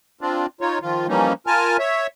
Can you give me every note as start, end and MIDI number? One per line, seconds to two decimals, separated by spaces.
0.21 0.46 60
0.21 0.46 62
0.21 0.46 65
0.61 0.79 63
0.61 0.79 65
0.61 0.79 73
0.82 1.07 51
0.82 1.07 53
0.82 1.07 65
1.08 1.33 52
1.08 1.33 53
1.08 1.33 55
1.08 1.33 58
1.08 1.33 61
1.08 1.33 63
1.47 1.77 65
1.47 1.77 70
1.47 1.77 80
1.47 1.77 81
1.47 1.77 89
1.79 2.07 73
1.79 2.07 76